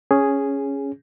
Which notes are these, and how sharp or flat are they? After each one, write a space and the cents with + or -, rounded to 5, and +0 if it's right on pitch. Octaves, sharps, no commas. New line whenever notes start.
C#4 +0 G#4 +0